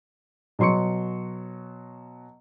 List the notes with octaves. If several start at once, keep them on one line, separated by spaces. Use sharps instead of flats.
B2 F#3 C6 C#6 C#7